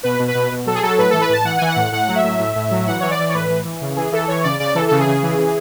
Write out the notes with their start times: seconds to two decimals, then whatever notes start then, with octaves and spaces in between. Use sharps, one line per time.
0.03 B2 B4
0.19 B2
0.28 B4
0.35 B2
0.52 B2
0.66 F#3 A4
0.75 G#4
0.83 F#3 A4
0.98 A2 B4
1.10 E3 A4
1.21 B4
1.29 A2 A5
1.45 E3 F#5
1.58 E3 G#5
1.68 F#5
1.76 A2
1.92 A2 F#5
2.08 F#3
2.15 E5
2.24 A2
2.39 A2
2.56 A2
2.71 F#3
2.87 E3 F#5
3.00 E3 C#5
3.10 D5
3.19 E3
3.29 C#5
3.34 A2 B4
3.49 E3
3.65 E3
3.81 C#3
3.96 E3 G#4
4.12 E3 A4
4.28 E3 C#5
4.43 C#3 D5
4.60 C#3 D5
4.75 E3 A4
4.88 C#3 A4
4.99 G#4
5.07 C#3
5.23 E3
5.38 E3